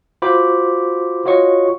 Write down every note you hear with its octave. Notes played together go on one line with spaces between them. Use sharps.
F4 F#4 C5 B5 D6
F4 F#4 C#5 D#5 C#6